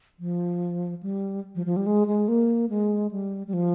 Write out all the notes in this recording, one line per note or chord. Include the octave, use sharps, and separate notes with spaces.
F3
G3
F3
F3
G3
G#3
G#3
A#3
G#3
G3
G3
F3